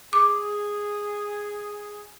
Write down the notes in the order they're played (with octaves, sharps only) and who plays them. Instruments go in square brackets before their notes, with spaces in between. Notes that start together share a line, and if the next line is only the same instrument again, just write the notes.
[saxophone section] G#4 [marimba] D6